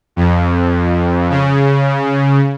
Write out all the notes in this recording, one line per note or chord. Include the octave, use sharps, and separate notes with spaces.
F2
C#3